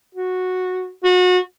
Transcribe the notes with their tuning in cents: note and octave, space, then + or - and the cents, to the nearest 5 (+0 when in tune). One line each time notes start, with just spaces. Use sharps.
F#4 -10
F#4 -30